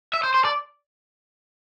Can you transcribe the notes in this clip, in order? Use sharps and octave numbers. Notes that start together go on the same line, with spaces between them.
E5
C5
C5
D5